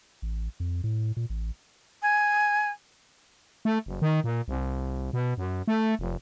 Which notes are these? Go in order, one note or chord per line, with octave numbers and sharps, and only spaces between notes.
A1
F2
A2
A#2
A1
G#5
A3
F#1
D#3
A#2
C2
B2
F#2
A3
F1